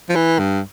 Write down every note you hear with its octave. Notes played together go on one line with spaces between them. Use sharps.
F3
E3
G2